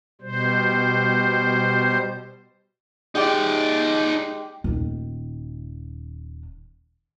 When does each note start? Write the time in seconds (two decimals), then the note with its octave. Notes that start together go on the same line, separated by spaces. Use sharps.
0.21 B2 G3 C5
3.15 G#3 D#4 G4 D5
4.64 D#1 D#3